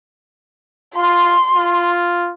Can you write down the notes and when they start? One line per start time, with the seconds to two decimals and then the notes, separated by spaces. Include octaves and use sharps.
0.96 F4 C6
1.54 F4